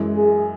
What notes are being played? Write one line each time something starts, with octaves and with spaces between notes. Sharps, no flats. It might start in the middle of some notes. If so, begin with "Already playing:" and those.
Already playing: F#2 E3 G#3
G#4